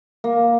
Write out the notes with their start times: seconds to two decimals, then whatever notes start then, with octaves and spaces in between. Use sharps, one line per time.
0.24 A#3